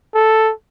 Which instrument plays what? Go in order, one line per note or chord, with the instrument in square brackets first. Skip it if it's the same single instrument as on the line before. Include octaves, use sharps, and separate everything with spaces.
[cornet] A4